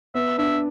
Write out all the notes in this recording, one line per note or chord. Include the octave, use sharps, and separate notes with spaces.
B3 E5
D4 E5